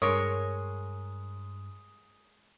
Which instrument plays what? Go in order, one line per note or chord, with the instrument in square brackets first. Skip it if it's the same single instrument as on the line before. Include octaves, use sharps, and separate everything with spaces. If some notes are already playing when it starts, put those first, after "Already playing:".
[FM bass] G2 [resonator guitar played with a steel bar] G#3 A#4 C#5 [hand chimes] D#6